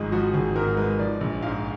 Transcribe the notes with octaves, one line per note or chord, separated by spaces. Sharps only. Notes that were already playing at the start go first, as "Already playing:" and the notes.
Already playing: G#1 G#2 F3 G#3 G#4
F3 F#4
G#1 G#4
G#2 A#4
G#3 B4
F3 D5
A#1
G#2 F5